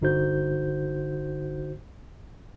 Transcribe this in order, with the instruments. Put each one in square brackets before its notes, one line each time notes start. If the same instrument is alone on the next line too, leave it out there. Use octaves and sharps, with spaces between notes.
[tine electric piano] G1 D3 D#4 F#4 C5 G6